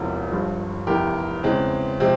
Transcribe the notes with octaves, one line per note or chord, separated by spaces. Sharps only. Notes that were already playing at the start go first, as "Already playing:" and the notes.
Already playing: E1 E2 C3 F3
G1 G2 F3
F1 E2 E3 G4 A#4
E2 C#3 E3 G#3 C4
C3 F3 G#3 C4